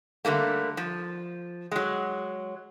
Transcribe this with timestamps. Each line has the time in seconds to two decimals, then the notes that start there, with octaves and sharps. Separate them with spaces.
0.25 D3 G3 A3 A#3
0.77 F3
1.71 F#3 G#3